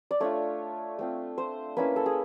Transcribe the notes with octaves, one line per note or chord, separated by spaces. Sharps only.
D5
A3 D4 F4 C#5
A3 C4 F4
C5
A#3 C#4 E4 B4
A4
G#4